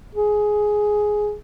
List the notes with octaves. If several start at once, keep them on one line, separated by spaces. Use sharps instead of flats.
G#4